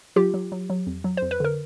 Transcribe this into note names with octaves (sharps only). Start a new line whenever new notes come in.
F#3 F4 G4
F#3
F#3
F#3
F2
F#3
F2 C5
B4
D3 A#4